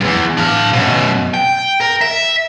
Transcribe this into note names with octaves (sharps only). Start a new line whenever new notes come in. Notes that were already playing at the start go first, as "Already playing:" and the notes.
E2 G2
D4 F5
F#2 B2
G5
A#4
E5